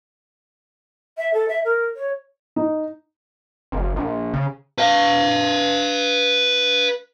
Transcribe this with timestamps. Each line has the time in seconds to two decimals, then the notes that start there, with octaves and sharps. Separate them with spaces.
1.18 E5
1.34 A4
1.48 E5
1.65 A#4
1.96 C#5
2.56 D#4
3.72 F#1
3.96 A#1
4.34 C#3
4.78 B4 F5